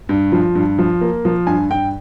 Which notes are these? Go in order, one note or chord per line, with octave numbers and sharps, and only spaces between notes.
G2
F3
G2
F3
A#3
F3
G2 G#5
G2 G5